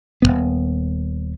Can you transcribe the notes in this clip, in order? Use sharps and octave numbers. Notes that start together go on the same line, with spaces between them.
D#1 F#2 B3